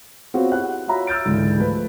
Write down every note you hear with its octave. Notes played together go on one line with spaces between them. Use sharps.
B3 C4 F4 F#4 G#4 C#5
E4 G4 F#5 F#6
F4 F#4 C#5 E5 A#5 B5
E6 F6 G6 A6 D7
C#2 G#2 D3 E3 G#3
F3 A3 B4